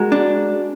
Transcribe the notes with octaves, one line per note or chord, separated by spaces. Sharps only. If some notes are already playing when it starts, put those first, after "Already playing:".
Already playing: G#3 F#4 A#4
D4